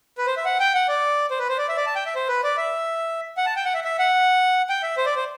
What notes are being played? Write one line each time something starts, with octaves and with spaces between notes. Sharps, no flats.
B4
C5
E5
F#5
G5
F#5
D5
C5
B4
C5
D5
E5
D5
A5
G5
E5
C5
B4
D5
E5
F#5
A5
G5
F#5
E5
E5
F#5
G5
E5
C5
D5
C5